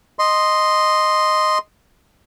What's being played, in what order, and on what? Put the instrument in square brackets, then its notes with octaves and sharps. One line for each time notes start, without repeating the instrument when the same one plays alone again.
[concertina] D#5 C6